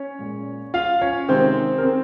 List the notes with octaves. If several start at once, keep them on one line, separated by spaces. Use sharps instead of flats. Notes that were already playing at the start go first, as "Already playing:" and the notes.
Already playing: C#4 C#5
A#2 G#3
F4 F5
C#4 C#5
C3 D#3 G#3 C4 C5
A#4
C4 C5